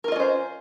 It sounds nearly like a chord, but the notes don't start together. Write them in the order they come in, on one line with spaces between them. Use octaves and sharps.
A#4 F4 D#5 C#4 C5